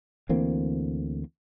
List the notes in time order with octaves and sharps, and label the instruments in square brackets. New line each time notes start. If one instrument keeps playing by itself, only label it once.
[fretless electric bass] D2 E3 A#3 C4